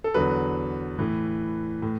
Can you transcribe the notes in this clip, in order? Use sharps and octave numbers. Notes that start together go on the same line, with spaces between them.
A4
E2 D3 F#3 B4
A2 E3
A2